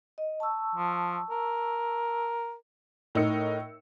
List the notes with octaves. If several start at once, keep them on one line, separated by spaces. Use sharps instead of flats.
D#5
A5 C#6 E6
F3
A#4
A2 D#4 A#4 D#5 E6 C#7